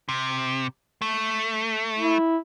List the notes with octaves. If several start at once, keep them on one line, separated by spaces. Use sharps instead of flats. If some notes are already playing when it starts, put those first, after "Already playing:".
C3
A3
E4